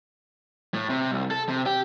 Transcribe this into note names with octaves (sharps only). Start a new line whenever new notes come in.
A2
C3
C2
A4
C3
G4